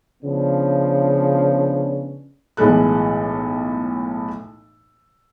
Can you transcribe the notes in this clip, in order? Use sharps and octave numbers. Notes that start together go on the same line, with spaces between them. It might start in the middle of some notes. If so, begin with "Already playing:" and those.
C#3 F3 B3 C#4 D4
B1 A2 E3 G#3 A4 F#6